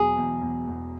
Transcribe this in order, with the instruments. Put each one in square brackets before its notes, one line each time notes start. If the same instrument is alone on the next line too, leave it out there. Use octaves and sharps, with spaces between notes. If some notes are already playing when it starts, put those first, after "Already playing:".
Already playing: [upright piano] E1 E2 F#3 [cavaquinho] G#4
[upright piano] E2
E2
E2